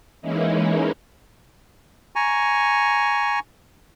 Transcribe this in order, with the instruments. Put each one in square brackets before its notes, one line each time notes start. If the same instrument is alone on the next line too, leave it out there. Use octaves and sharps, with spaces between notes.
[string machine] E3 G#3 A#3 C#4 D#4 E4
[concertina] G#5 A#5 C#6